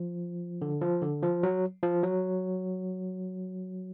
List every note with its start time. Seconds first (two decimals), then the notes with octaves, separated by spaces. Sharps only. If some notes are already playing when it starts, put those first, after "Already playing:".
Already playing: F3
0.62 D3
0.81 F3
1.02 D3
1.23 F3
1.43 F#3
1.83 F3
2.03 F#3